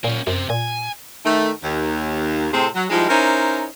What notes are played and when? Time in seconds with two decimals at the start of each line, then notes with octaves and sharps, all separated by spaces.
0.04 A#2 A#3 C#4
0.27 F#2 C3 C4
0.50 A#2 G#5
1.25 D#3 A3
1.63 D#2
2.53 A2 C3 C4 G#4 A4
2.75 F#3
2.90 F3 G3 G#3 D#4 E4
3.09 C#4 D#4 E4 A#4 C5